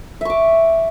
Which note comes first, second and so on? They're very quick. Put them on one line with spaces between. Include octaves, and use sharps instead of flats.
E5 C#6 D6